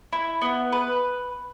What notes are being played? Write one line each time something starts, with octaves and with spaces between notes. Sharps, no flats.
E4
B3
B4